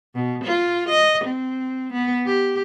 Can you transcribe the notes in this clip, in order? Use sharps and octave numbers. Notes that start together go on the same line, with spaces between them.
B2
F4
D#5
C4
B3
G4